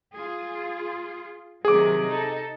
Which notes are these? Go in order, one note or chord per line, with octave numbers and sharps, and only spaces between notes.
F4 G#4
C3 D#3 F#3 G#4 D6
D#4 A4